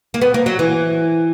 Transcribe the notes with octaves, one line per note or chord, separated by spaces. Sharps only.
A#3
B3
A#3
F#3
E3